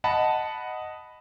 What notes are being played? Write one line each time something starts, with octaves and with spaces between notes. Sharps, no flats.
D#5 F#5 A5 B5